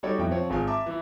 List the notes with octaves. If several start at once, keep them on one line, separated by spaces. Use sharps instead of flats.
G3 D#4 F#4 A4 C#5 D5
F2 B2 E4 G5
F3 C4 C#5
G#1 F4 G#4 G#5
E5 A5 A#5 D6
E3 E4